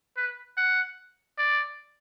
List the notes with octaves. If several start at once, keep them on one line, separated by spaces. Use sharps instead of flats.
B4
F#5
D5